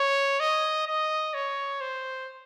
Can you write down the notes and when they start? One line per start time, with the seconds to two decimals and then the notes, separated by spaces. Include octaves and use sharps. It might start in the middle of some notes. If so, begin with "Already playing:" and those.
Already playing: C#5
0.40 D#5
0.87 D#5
1.34 C#5
1.81 C5